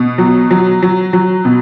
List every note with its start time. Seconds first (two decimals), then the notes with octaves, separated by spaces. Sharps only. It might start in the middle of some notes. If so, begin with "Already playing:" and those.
Already playing: B2
0.18 F#3
0.51 F#3
0.82 F#3
1.13 F#3
1.45 B2